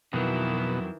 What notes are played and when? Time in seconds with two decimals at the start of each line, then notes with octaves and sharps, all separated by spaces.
0.13 F2 B2 D#3 E3 F#3